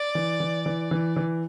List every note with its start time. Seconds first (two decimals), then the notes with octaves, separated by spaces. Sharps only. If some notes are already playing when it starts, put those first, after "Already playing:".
Already playing: D5
0.15 E3
0.40 E3
0.66 E3
0.91 E3
1.16 E3